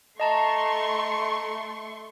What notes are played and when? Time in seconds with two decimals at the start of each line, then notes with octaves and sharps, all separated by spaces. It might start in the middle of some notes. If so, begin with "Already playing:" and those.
0.20 A3 D#5 A5 A#5 C6 C#6